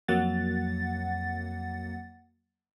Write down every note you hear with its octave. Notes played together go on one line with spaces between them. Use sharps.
F2 F#3 A#3 F#5 A6